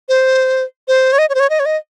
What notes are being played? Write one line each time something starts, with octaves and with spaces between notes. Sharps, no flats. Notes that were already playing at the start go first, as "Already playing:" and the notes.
C5
C5
C#5
D#5
C#5
C5
C#5
D#5
C#5
D#5